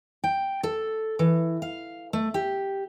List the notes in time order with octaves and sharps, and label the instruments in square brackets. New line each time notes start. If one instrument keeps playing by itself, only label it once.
[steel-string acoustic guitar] G5
A4
E3
F5
A3
G4